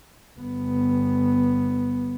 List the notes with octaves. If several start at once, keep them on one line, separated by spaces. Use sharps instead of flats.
G1 B3